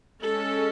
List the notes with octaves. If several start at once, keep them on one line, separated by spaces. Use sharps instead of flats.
G#3 C#4 A4